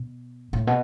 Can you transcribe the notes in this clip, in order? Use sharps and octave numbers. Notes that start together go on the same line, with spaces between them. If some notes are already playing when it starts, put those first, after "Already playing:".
Already playing: B2
A2
B2